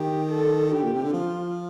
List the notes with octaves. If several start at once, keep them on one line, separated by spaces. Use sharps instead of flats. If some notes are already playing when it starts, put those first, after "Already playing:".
Already playing: D#3 G4
A4
D3 G4
A#2
C3
D3
F3 F4